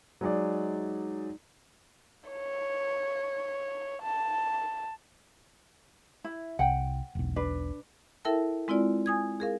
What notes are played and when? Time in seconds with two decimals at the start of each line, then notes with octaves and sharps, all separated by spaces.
0.21 F#3 G#3 D#4 D5
2.30 C#5
4.02 A5
6.24 E4
6.59 C2 F#5 G5
7.15 E1 B1
7.36 D4 B4
8.25 E4 A4 A#4 E5 G5 A5
8.68 G#3 C4 E4 F4 D5
9.06 G#5 D#6 G#6
9.40 G#4 A#4 F5